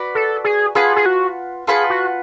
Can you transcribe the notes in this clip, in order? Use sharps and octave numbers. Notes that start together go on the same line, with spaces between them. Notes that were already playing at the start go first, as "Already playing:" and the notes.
Already playing: F#4 B4 D5
A4
G#4
F4 G#4 B4 F#5 A5
G#4
F#4
F4 G#4 B4 F#5 A5
F#4